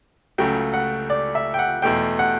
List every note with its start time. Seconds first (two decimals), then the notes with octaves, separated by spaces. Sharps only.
0.38 C#2 C#3 F#3 A3 G5
0.74 F#5
1.10 D5
1.35 E5
1.54 G5
1.59 F#5
1.82 E2 B2 A3 G5
2.19 F#5